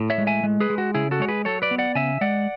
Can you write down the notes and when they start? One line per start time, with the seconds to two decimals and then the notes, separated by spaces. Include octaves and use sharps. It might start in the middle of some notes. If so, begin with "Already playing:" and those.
Already playing: A2
0.10 C#5 E5
0.18 G#3
0.27 E5 G#5
0.43 G#3
0.60 G#4 B4
0.70 G#3
0.78 F#4
0.94 C#3 E4 G#4
1.11 F#4 A4
1.20 G#3 C#5
1.29 G#4 B4
1.45 F#3 A4 C#5
1.62 B4 D5
1.71 B3
1.78 D5 F#5
1.95 C#3 E5 G#5
2.21 G#3 D5 F#5